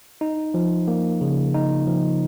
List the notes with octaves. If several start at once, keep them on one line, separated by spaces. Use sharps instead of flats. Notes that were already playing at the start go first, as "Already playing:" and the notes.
D#4
F3
A#3
C#3
D#4
F3